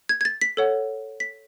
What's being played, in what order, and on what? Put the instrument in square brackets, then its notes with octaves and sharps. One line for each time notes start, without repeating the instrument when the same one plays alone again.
[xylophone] G#6
G#6
A6
B6
A4 C#5 F#5
B6